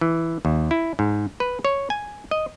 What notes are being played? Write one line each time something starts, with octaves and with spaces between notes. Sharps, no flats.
E3
D#2
E4
G#2
B4
C#5
G#5
D#5